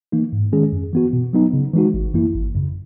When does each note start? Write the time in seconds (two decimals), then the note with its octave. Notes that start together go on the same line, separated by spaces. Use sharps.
0.12 E3 A#3 D#4
0.33 G#2
0.52 D#3 G#3 C#4 G#4
0.72 F#2
0.93 E3 B3 F#4
1.13 B2
1.33 F#3 B3 D#4
1.53 C#3
1.74 E3 G#3 D#4 F#4
1.94 G#1
2.14 F#2 E3 A#3 E4
2.34 G#1
2.54 F#2 C#3